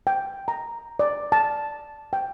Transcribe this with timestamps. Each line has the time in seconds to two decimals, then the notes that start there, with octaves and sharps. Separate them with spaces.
0.07 G5
0.48 A#5
0.99 D5
1.32 A5
2.13 G5